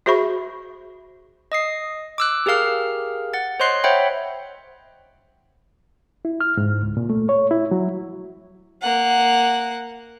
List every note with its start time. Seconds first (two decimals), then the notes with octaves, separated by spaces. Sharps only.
0.06 F#4 G#4 C5 E5 B5 C#6
1.52 D#5 D#6 C7
2.18 D6 E6 F#6
2.46 G4 G#4 A#4 F5 F6
3.34 F#5 A6
3.60 C5 C#5 D#5 C6 F#6 C7
3.84 C5 C#5 E5 F#5 G5 B5
6.25 E4
6.41 F6
6.57 G#2
6.82 C#2
6.97 A#2
7.10 A3
7.29 C#5
7.51 E4
7.71 F#3
8.82 A#3 F#5